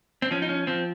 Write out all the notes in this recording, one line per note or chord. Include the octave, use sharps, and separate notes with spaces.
C4
F3 C#4
D#4
C#4
F3 C4